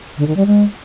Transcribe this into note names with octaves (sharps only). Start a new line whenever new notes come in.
D3
D#3
G3
G#3